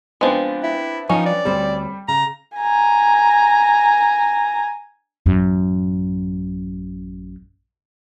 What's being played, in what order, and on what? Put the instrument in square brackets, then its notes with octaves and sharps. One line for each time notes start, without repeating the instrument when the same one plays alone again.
[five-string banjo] F3 G#3 [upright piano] B3 C4 D4
[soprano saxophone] E4
[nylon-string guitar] F3 [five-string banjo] C#4 [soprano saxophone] D#4
[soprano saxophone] D5
[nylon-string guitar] D2 C4 C5 [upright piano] G3
[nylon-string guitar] C#3 [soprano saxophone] A#5
[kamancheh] G#5 A#5
[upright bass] A1 F#2